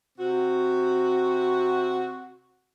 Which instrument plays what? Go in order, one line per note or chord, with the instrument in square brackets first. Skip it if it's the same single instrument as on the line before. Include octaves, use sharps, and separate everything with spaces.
[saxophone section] C3 C4 F#4